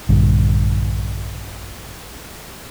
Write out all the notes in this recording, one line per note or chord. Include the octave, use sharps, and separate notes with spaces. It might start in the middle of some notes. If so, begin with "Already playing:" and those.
A#1 G2 D3